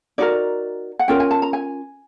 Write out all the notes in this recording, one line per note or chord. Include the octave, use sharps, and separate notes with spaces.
D#4 F#4 A#4 D5
F#5
C#4 F4 A#4 G5
G#5
A5
A#5
G#5